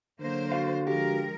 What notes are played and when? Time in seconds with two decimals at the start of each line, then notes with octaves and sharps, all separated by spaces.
0.20 D3 F#3 A#3 C5
0.52 F#4 F5
0.87 F3 G#3 G4 A#4